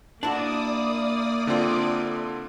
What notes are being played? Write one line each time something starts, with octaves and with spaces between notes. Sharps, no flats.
A#3 D4 E4 F#4 D5 D6 D#6
D3 C4 F4